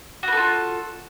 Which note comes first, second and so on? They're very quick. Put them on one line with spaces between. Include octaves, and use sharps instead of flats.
F#4 B4 A4 F4